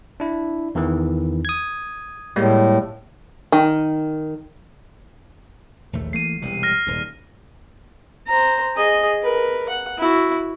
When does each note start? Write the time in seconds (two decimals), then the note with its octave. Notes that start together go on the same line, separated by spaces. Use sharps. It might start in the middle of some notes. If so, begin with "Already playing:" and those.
0.20 D4 E4
0.75 E2 D#3 E3
1.45 D#6 G#6
2.36 A2 G3 G#3 A#3
3.52 D#3
5.93 A#1 D#2 A3
6.13 E3 A3 A#3 C7 D#7
6.42 E1 C2 C3
6.63 F6 A#6
6.87 D#1 G#2
8.27 C5 A#5
8.75 G#4 D#5
9.23 A#4 B4
9.69 F#5
9.98 E4 F#4